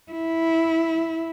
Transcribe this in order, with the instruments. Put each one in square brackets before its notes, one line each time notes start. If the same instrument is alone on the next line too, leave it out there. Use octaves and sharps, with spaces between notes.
[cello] E4